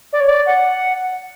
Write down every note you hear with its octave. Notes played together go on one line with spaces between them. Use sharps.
D5
C#5
D5
F#5